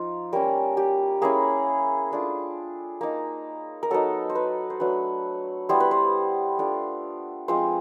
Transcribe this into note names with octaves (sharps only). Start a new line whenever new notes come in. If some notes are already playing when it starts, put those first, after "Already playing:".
Already playing: F3 D#4 F4
G3 A#3 C#4 F4 A#4
G4
A#3 C#4 E4 G#4
A3 D4 F4
A#3 D#4
A#4
F#3 B3 D#4 A4
C5
B4
C5
F#3 A3 D4 B4
G3 B3 E4 C5
B4
C5
A3 D4 F4
F3 G#3 C4 F4 C5